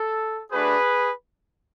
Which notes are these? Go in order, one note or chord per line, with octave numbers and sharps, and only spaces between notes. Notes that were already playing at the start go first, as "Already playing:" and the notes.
Already playing: A4
A3 D4 F#4 G#4 B4